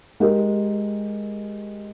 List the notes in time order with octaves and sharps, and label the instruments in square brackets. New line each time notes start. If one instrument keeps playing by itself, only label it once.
[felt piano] G#3 G4 A#4